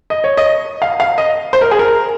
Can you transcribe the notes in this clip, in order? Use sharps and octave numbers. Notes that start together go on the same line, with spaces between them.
D#5
C#5
D#5
F5
F5
D#5
C5
A#4
G#4
A#4